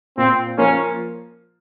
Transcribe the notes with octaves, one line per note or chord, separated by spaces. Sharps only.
A#2 C4
F3 A#3 C#4 F4